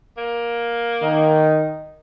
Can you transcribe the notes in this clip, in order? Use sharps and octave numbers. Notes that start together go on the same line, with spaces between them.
A#3
D#3 D#4